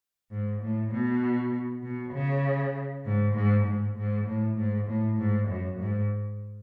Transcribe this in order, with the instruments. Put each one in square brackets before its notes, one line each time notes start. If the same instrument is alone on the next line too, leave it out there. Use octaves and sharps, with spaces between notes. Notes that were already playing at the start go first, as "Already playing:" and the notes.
[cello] G#2
A2
B2
B2
C#3
G#2
G#2
G#2
G#2
A2
G#2
A2
G#2
F#2
G#2